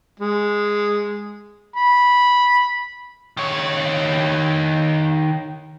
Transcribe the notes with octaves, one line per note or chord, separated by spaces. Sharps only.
G#3
B5
D#3 C#5